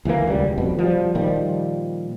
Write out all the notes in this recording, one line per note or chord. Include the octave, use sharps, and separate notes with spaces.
D2 E3 G#3 A#3
D#1 C#2 D#3 G3
F1 F2 B2
F3 G3
A#2 D#3 F3 G3